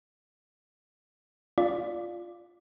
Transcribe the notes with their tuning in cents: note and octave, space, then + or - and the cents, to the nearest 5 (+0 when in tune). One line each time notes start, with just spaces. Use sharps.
F4 +0 D5 +0